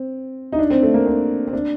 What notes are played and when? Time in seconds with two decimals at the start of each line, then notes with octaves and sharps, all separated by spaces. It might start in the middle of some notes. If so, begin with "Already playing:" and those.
Already playing: C4
0.52 D#4
0.59 D4
0.70 C4
0.83 A3
0.94 A#3
1.06 C4
1.47 C4
1.53 D4